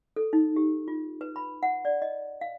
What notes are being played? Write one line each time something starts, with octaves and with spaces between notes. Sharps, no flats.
A4
D#4
G4
F4
B4
B5
F#5
D5
D#5
F5